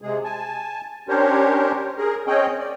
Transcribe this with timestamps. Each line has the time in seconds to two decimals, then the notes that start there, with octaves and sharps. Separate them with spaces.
0.02 C3 G#3 G#4
0.24 G#5 A5
1.08 C#4 D4 G4 A#4 C5 C#5
1.98 G#4 A#4
2.27 C4 C#4 G#4 C#5 D#5 G5
2.59 D5